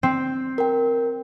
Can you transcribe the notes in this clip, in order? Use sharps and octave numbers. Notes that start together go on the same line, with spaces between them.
C4
A#4 G5